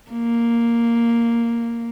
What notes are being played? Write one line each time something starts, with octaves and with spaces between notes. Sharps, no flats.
A#3